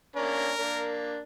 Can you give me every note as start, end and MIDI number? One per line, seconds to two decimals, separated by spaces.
0.16 0.52 58
0.16 0.52 61
0.16 0.52 62
0.16 0.99 70
0.58 1.22 58
0.58 1.22 62